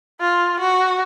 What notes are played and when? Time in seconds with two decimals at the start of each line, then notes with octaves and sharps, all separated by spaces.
0.21 F4
0.60 F#4